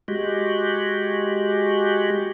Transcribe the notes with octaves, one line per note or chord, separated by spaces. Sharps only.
G#3 F#4 G4